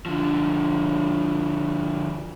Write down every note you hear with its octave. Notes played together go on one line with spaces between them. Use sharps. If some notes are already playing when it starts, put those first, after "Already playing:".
D3 F3